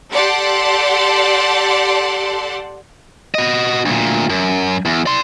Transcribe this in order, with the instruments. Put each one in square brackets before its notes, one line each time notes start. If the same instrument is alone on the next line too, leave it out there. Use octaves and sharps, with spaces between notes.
[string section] G4 A4 D5 F#5 A5 C6
[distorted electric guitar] F#4 D#5
D2 A#2
F#2
E2
D5 C6